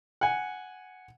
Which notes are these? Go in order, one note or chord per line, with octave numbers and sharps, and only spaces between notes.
F#5 G#5